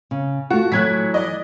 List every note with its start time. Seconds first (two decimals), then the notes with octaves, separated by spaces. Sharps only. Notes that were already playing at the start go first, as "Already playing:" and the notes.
0.11 C#3
0.50 A3 F4 F#4
0.72 E3 F#3 A3 F#6 G#6 B6
1.14 D5 D#5